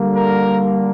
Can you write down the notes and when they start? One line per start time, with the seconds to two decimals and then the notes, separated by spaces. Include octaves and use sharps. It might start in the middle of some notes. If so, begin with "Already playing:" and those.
Already playing: D3 G3 A#3
0.16 A#4